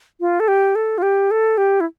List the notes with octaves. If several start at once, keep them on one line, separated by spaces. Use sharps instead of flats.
F4
A4
G4
A4
F4
G4
A4
G4
E4